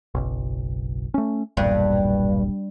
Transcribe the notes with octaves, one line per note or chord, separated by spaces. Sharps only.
F#1 B1
A3 C#4
E1 B1 G2 A#2